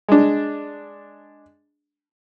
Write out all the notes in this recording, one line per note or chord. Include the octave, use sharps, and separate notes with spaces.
G#3 D4